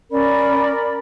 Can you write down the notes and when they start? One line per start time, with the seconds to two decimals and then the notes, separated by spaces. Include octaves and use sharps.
0.11 C#4 A#4 D5 B5